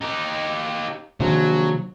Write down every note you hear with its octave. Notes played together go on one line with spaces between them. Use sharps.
D#4 G4
A#1 C3 D#3 F#3